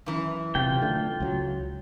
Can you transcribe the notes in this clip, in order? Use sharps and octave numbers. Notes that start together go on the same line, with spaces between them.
F#2 E3
E1 C3 F4 G5
D3 A3
C#2 F#3